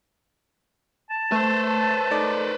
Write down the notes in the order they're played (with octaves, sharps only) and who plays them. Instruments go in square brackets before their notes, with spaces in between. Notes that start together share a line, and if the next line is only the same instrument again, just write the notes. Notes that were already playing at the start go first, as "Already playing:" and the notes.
[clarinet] A5
[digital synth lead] A3 [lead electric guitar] B4 C5
[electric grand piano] A3 D#4 D5